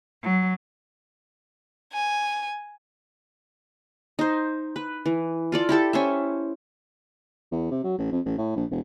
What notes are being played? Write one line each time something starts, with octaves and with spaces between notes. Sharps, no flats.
F#3
G#5
D#4 C5
B4
E3
F4 A4 D5
E4 G4 A4 A5
C#4 C5 E5
E2
C3
F#3
A1
F2
A1
A2
A#1
E1